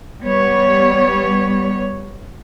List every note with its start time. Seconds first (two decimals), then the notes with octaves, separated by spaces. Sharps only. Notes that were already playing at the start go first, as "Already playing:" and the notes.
0.24 G3 B3 C#5